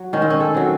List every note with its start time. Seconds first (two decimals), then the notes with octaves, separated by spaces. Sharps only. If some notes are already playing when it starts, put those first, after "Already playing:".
Already playing: F#3
0.13 D#3 C#4
0.22 C4
0.30 C#4
0.40 A4
0.54 F#3 C4